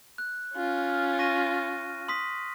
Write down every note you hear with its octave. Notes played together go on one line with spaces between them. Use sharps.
F#6
C#4 F4
F6
C#6 A#6 D#7
C6 D#6 B6